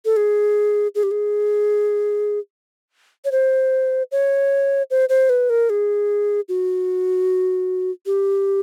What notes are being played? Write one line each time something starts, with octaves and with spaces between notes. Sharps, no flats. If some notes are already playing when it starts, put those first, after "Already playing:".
A4
G#4
G#4
G4
G#4
C#5
C5
C#5
C5
C5
B4
A#4
G#4
F#4
G4